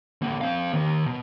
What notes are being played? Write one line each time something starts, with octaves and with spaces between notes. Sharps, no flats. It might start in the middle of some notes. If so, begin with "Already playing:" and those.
D3 A#3
C4 F5
D#3 A#3
B2